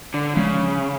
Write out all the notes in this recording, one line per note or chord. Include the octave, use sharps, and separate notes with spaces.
D3
C#3 F3 G#3 C#4